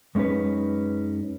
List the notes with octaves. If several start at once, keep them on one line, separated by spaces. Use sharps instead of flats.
F#2 G#3 C#4 D#4 B4